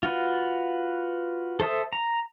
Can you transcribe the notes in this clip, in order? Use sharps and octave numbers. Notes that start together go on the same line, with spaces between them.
F4 F#4 B4
A4 C5 E5 D#6
A#5